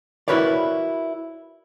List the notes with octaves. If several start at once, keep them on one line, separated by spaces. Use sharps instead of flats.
E4 F#4 A#4 B4 C#5 D5